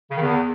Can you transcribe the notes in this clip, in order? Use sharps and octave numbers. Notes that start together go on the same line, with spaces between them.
C#3
D#3
E2